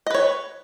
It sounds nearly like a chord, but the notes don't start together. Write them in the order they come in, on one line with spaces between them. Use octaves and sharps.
D#5 B4 C#5